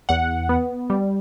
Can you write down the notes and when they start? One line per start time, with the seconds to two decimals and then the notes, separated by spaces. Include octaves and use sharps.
0.09 E2 F#5
0.49 B3
0.90 G3